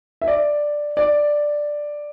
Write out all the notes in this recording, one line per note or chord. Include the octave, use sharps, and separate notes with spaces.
E5
D5
D5